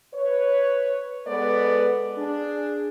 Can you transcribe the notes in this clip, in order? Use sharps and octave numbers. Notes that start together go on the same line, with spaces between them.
B4 C#5
G#3 B3 A4 B4 D5
D4 G#4